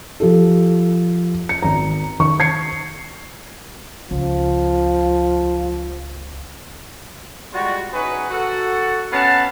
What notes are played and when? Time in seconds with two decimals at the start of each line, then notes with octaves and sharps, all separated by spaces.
0.20 F3 G4 A4
1.49 C#7
1.63 G#1 A#5
2.20 D#3 C#6
2.40 G#6 C7 C#7
4.11 C#2 F3
7.53 G3 G#3 F4 F#4
7.93 C#4 D#4 F#4 G#4 B4
8.30 F#4 A4
9.12 B3 C#4 F5 F#5 A5